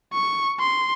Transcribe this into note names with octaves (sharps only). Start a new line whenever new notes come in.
C#6
C6